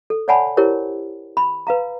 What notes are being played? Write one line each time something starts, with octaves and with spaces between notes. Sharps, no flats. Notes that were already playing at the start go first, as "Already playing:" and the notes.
A4
C#5 D5 F#5 G#5 A5 B5
E4 G4 A#4 C5 C#5
B5
B4 F5 A#5